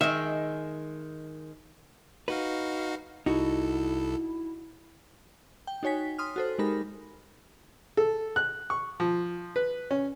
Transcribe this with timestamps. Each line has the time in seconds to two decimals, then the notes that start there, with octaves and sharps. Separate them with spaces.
0.01 D#3 G#3 E5
2.28 D#4 F#4 B4 F5
3.26 C2 D#4 E4 F#4 A4
5.67 G5
5.83 D#4 F#4 C#5 G#5 B6
6.18 C6 D#6 F6
6.36 F#4 A4 C5
6.58 G#3 D#4 G4 A#4 B5 A#6
7.97 A4
8.36 F#6
8.70 C#6
9.00 F3
9.56 B4
9.91 C#4